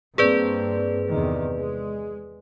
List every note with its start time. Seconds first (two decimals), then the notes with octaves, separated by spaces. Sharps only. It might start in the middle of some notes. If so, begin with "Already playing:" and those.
0.18 G2 A#3 C4 G#4 B4 D5
1.09 E2 C3 D#3
1.56 G#3